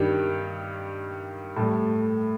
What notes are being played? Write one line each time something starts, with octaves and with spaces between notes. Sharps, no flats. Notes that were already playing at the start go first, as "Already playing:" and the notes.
Already playing: G2 D#3 G3 G4
A2 G3 A4